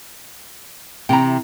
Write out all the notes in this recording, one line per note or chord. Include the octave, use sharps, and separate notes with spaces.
C3 E3 G5 A#5